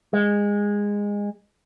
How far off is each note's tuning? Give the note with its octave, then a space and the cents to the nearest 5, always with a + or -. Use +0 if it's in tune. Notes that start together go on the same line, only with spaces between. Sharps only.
G#3 -20